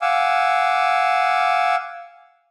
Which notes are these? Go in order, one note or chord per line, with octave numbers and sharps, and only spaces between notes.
F5 F#5 G#5 D6 E6